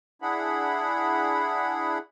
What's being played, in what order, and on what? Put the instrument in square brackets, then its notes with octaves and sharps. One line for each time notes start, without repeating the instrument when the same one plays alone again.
[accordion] D4 E4 G#4 F#5 B5